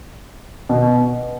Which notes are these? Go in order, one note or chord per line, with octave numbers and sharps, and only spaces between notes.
B2